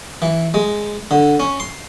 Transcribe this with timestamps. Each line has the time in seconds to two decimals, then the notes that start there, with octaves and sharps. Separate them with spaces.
0.22 E3
0.54 G#3
1.11 D3
1.40 C#4
1.60 C6